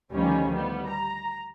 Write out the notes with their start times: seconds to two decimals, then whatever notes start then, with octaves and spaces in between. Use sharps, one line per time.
0.12 D2 A2 D#3 F3 G3 C#4
0.52 G3 B3
0.89 A#5